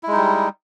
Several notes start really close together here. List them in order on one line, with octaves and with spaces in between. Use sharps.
E4 G#3 D#4 G3